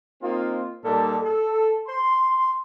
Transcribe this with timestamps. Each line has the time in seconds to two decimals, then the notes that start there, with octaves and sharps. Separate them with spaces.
0.22 A#3 C4 D#4 F4
0.84 A#2 G3 D#4 A4 A5
1.21 A4
1.87 C6